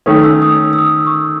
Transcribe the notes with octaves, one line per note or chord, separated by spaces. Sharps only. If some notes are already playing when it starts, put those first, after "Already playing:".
D#3 A3 C#4 D#6
E6
D#6
E6
D#6
C#6
D#6